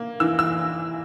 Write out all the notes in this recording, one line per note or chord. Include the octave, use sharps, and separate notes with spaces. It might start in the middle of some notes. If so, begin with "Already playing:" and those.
Already playing: A#3
E3 E6
E6